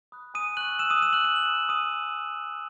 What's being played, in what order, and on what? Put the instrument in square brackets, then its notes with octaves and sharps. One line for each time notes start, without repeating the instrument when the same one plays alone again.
[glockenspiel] B5 D#6 F#6
G#5 D#6 D#7
C#6 E6 F#6 F#7
G#5 E6 E7
D#6 D#7
C#6 E6 E7
F#6 F#7
G#5 E7
F#7
B5 D#6 E6 F#6 E7
G#5 D#6 D#7